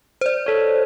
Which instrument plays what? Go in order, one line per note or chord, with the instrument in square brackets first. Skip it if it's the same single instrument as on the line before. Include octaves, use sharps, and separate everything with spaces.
[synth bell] C5 D5
[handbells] A4 C#5